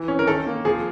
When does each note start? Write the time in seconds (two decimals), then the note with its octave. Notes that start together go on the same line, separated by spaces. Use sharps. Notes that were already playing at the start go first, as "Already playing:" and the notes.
Already playing: E3
0.08 C#4
0.19 A#4
0.27 D#3 A4
0.46 A#3
0.65 F3 G#4